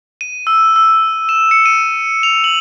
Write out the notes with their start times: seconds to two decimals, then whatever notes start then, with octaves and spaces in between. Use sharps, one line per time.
0.21 D#7
0.47 E6
0.76 E6
1.29 E7
1.51 C#7
1.66 D#7
2.23 F7
2.44 F#7